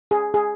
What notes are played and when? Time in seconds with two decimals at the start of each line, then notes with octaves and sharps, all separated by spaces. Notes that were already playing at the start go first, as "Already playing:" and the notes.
0.11 G#4
0.34 G#4